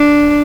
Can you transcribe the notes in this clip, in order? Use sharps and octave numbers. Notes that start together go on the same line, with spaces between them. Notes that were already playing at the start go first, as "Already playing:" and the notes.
Already playing: D4